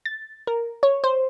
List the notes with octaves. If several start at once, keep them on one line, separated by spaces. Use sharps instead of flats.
A6
A#4
C#5
C5